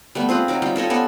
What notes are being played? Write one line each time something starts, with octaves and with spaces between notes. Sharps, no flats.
G3 A3 B3
C4 F4 G#4 B4
F#3 D#4 D6
G3 F4 G4
F4 A4 C#5 D#5
B3 C#4 A4 D5